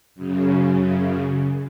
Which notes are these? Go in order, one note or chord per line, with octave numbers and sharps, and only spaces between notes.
F#2 C#3